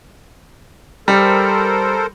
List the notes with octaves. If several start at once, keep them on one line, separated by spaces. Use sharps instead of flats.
G3 A4 A#4 C5